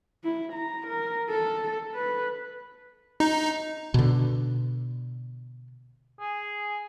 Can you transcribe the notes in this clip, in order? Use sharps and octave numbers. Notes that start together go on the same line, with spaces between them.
E4
A#5
A#4
A4
B4
D#4
B2 D3
G#4